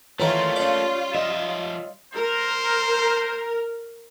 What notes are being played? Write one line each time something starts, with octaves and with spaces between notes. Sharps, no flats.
D#3 E3 G3 A3 A#3 F4 C#5 A#5
C#4 D5
F3 D#5 E5
A#4 C5